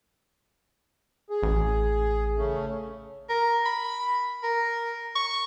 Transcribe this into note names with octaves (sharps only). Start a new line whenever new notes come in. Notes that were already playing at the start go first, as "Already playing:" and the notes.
G#4
A1
C#3 A3 C#4
A#4
B5
A#4
C#6